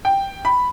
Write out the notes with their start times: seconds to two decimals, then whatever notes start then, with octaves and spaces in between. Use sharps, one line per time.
0.05 G5
0.45 B5